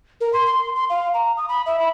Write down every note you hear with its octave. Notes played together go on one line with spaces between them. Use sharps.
A#4
C6
C6
C6
F5
A#5
D#6
B5
E5
B5